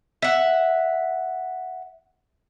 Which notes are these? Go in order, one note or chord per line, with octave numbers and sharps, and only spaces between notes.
E5 F#5